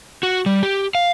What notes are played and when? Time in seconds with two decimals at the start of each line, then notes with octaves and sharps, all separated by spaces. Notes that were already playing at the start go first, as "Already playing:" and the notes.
0.23 F#4
0.46 G3
0.63 G4
0.95 F5